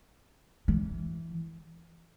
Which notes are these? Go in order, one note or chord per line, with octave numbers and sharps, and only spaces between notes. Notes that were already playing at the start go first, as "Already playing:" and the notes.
E3